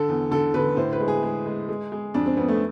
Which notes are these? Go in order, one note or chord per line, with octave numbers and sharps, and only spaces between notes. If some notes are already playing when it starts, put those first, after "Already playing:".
Already playing: D3 A4
E2
D3 A4
D3 B4
A2 C5
B4
G#3
G#4
G#3
G#3
G#3
G#3
F2 D4
C4
F2 B3
A3